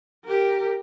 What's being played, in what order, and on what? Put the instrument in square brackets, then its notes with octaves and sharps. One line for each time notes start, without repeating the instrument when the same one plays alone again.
[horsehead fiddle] G4 A#4